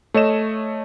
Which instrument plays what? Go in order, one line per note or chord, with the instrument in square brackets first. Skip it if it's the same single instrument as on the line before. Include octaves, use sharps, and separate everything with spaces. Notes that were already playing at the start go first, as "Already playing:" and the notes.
[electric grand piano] A3 C#5 D#5 E7